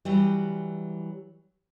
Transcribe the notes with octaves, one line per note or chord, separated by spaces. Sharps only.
E3 F#3 G3